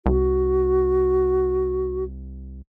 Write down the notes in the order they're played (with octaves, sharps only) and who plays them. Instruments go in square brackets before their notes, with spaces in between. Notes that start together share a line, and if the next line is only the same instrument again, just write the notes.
[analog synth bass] C2 [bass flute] F#4